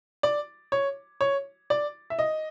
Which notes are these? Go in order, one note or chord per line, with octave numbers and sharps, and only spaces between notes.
D5
C#5
C#5
D5
E5
D#5